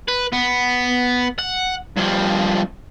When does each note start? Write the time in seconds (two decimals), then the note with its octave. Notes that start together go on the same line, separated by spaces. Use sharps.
0.08 B4
0.33 B3
1.39 F#5
1.97 G2 F3